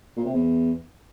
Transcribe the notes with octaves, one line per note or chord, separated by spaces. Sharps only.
A#2
C3
E2